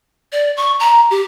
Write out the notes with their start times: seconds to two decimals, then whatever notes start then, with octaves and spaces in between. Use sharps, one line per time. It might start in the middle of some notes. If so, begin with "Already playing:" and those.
0.32 D5
0.57 C#6
0.80 A#5
1.11 G4